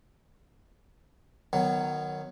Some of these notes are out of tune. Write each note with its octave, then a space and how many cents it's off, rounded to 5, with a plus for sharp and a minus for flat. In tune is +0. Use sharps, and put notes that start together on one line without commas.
D#3 -20 F#3 +0 B3 +0